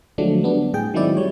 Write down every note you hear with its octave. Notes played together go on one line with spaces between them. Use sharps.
D3 F3 F#3 G#3 A3 D4
G3 B3 D4
A2 G#4 G5
D#3 F#3 G#3 C4 E4 D5
G3 C#5